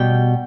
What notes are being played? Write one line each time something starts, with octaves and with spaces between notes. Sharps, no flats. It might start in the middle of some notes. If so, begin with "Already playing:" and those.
Already playing: B2 G3 G5